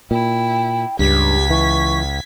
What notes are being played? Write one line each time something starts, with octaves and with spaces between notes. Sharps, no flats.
A#2 E4 G5
C#2 G2 G4 G#6 B6
E3 C#6